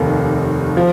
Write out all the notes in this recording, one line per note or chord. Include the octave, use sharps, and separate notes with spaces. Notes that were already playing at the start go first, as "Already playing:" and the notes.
Already playing: F1 D#2 D#3
F3